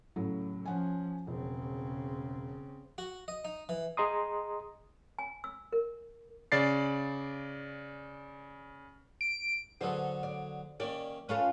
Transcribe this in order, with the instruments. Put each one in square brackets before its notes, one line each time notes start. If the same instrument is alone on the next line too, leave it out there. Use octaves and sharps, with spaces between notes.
[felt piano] A2 C#3 F#3
[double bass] F3 [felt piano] C#4 F#5 G#5
[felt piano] E1 [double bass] C#3 C4
[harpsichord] F#4
D#5
D#4
E3
[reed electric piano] G#4 D#5 A#5 C6 D#6
[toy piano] G#5
E6
A#4
[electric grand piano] C#3 D5 A6 C7
[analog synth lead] D7
[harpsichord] D3 F#3 G#4 [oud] A4 B4 C5
[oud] D5
[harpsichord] D#3 A#3 C#4 [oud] D5
[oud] C#4 F4 A4 [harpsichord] B4